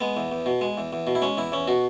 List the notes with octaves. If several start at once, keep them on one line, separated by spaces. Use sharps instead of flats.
G#3 B3
E2
E2
B2
G#3
E2
E2
B2
E4
G#3 C#4
E2 E4
E2 C#4
B2 F#4